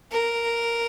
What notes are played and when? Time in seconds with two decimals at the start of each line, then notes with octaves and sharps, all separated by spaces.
0.11 A#4